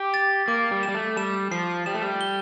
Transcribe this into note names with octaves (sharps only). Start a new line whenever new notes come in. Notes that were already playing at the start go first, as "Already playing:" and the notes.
Already playing: G4 D6
A6
A#3 D6
G3
E7
G3
A3
G3 E7
F3 C7
G3 E7
A3
G3
G7